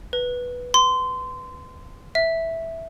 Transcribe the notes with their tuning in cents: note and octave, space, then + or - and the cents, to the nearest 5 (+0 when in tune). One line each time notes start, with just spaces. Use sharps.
B4 -5
C6 -20
E5 -5